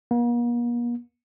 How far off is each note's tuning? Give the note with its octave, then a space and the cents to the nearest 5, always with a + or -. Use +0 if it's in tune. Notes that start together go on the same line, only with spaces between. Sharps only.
A#3 +45